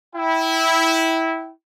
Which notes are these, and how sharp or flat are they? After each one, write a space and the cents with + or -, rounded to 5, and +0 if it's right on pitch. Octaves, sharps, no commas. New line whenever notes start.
E4 -15 G5 -25